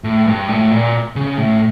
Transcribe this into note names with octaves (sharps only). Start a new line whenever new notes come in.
A2
G2
A2
A#2
C#3
A2